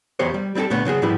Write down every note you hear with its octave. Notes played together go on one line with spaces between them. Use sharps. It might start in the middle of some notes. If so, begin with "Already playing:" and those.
B1 E2 B3 G4 C5 C#5
G3
G3 C4 D#4 G4 A4
C2 A#2 D3 A3 B3 C#5
C#3 F#3 F#4 G#4
G#2 F3 G3 E4 G4 B4